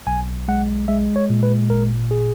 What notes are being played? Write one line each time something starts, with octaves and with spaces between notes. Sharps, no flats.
B1 G#5
G#3 F#5
G#3 E5
C#5
A#2
B4
G#1 A#4
G#4